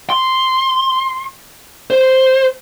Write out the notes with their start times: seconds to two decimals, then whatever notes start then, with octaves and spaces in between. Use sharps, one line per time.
0.10 C6
1.90 C5